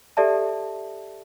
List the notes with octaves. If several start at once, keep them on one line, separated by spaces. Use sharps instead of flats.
G4 A4 D5 E5 A5